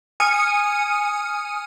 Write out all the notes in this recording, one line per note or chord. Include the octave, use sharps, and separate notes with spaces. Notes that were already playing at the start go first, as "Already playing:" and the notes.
G#5 D#6 F6 C#7 D#7